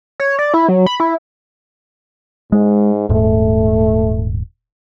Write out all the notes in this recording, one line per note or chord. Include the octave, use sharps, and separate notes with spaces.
C#5
D5
E4
F#3
B5
E4
G#2 G#3
D#1 G#2 A3